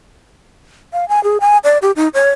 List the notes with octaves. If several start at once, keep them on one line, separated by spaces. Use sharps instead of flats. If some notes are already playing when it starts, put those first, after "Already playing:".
F5
G#5
G#4
G#5
D5
G4
D#4
C#5